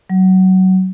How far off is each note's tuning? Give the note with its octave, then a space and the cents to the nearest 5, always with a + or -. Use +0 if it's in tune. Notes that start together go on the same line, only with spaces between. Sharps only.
F#3 +20